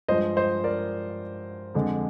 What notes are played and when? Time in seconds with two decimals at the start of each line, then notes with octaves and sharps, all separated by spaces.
0.08 G2 F3 G#3 C5 D#5
0.37 C5 D#5
0.64 A#4 D5
1.75 F2 D3 G#3